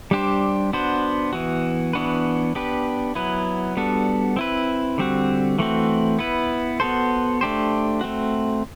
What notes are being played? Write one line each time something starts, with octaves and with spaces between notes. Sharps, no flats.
G3 D4 G4 C5
B3 D4 F#4 C5
E3 B3 F#4
E3 B3 D4 F#4 B4
B3 D4 G4 B4
F#3 B3 E4 B4
G3 B3 D4 F#4 A4
C4 E4 B4
D3 G3 C4 F#4
E3 A3 C4 F#4
B3 E4 B4
B3 F#4 A4 C5
A3 D4 G4 C5
A3 C4 F#4